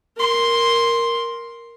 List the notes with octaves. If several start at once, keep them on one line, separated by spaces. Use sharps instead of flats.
A#4 C6